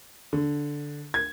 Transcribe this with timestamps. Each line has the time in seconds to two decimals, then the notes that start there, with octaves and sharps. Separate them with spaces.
0.33 D3
1.14 G#6